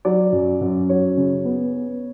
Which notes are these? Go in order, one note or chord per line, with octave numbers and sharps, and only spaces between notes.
F#3 D5
F#2
F#2
F#3 C#5
C#3
B3
B3